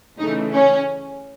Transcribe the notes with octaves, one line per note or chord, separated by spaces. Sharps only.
C#3 E3 A3 D#4
C#4